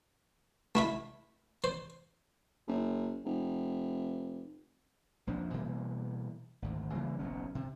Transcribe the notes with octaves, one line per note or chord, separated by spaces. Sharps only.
A3 E4 E5
C5
F#1
F1
A#1 F2 F3 D4
B2 E3 G3 A#3
G#1 D2
C#3 E3 G3 A#3
F#1 B1 C#4
C3